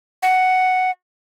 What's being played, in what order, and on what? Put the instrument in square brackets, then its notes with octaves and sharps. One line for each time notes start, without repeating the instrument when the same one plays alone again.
[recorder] F#5